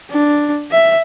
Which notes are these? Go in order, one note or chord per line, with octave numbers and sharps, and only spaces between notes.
D4
E5